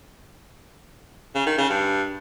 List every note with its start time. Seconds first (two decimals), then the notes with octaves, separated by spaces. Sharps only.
1.35 C#3
1.46 D#3
1.58 C#3
1.69 G2